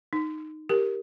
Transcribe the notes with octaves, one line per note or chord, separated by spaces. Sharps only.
D#4
G4 A#4